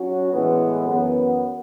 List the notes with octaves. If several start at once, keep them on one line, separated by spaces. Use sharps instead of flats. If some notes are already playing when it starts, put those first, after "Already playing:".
Already playing: F#3 C#4 F#4
A2 E3 G#3 B3
F#2 E3 B3